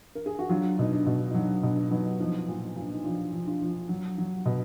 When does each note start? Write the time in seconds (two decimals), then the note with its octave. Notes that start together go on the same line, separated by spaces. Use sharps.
0.15 A#4
0.26 G#4
0.39 F#4
0.49 F#3 D4 F4
0.79 B2 D#4
0.92 D4
1.06 B2
1.31 D#4
1.34 F#3 D4
1.63 B2 D4
1.91 F#3 B3 D#4
2.19 F3 B3 D#4
2.48 A#2
2.76 A#2 D4
2.92 D#4
3.04 F3 D4 F4
3.32 F3
3.47 D4 F4
3.62 F3
3.89 F#3
4.18 F#3
4.46 B2